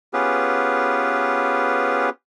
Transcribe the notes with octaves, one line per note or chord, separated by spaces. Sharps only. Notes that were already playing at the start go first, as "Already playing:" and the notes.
B3 C#4 F4 G4 G#4 B4